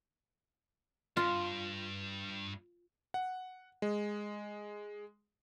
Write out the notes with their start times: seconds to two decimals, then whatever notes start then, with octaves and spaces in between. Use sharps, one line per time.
1.17 G2 F4
3.14 F#5
3.82 G#3